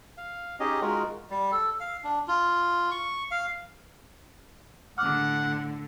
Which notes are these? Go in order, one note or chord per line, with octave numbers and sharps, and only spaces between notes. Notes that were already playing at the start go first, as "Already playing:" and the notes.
F5
C#4 D#4 G4 G#4 D#5
G#3 D#4 F4 F#4 A#4
G3
A4
F5
D4
F4
C#6
F5
A2 D3 F#5 D6 F6